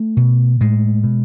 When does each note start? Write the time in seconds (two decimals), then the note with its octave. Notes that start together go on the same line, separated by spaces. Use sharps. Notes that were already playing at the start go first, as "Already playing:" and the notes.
Already playing: A3
0.17 B2
0.60 A2 G#3
1.03 B2